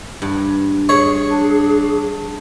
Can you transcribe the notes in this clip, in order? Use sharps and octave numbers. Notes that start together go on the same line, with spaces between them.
G2
G#4 C#5
D4